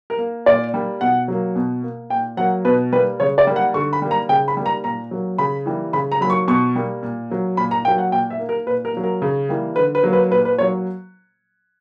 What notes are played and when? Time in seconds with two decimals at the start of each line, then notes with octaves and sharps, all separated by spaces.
0.10 A#4
0.18 A#3
0.46 A#2 D5
0.74 G3 A#3
1.01 B2 F#5
1.28 F#3 A#3
1.56 B2
1.83 A#3
2.10 A#2 G5
2.37 F#3 A#3 F#5
2.65 B2 B4
2.93 G3 A#3 B4
3.20 C#3 C#5
3.38 D5
3.47 G3 A#3
3.56 F#5
3.74 D3 C#6
3.93 B5
4.02 G3 A#3
4.11 A#5
4.29 C#3 G5
4.48 B5
4.57 G3 A#3
4.66 A#5
4.84 A#2 A#5
5.11 F#3 A#3
5.38 C#3 B5
5.66 E3 G3 A#3
5.93 C#3 B5
6.12 A#5
6.21 F#3 A#3 B5
6.30 C#6
6.48 B2 C#6
6.75 G3 A#3
7.03 A#2
7.30 F#3 A#3
7.57 A#2 B5
7.71 A#5
7.85 A#3 G5
7.88 F#3
7.98 F#5
8.12 A#2 G5
8.30 E5
8.39 A#3
8.49 A#4
8.67 A#2 B4
8.85 A#4
8.94 F#3 A#3
9.03 A#4
9.22 C#3
9.49 E3 G3 A#3
9.76 D3 B4
9.95 B4
10.03 F#3 A#3
10.13 B4
10.31 A#2 B4
10.45 B4
10.58 F#3 A#3 C#5